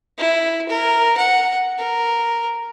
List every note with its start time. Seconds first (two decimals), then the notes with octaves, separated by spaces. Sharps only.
0.18 E4
0.69 A#4
1.17 F#5
1.78 A#4